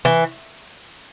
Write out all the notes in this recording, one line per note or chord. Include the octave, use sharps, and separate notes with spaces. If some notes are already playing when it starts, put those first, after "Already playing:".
E3